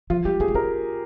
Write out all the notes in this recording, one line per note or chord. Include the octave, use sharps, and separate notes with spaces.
F3 F4
G3 G4
A#3 G#4
G#3
A#3 A#4